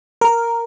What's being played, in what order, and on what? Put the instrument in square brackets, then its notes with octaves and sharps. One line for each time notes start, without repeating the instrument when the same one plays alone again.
[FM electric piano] A#4